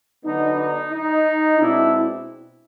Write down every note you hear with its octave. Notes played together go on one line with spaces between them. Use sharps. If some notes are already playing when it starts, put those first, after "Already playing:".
D3 F#3 B3 D4 D#4
D#4
D#4
B2 G#3 C4 D4 E4